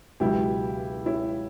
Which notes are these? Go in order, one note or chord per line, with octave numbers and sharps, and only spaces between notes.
C#2 B2 F#3 E4 G4
C#4 E4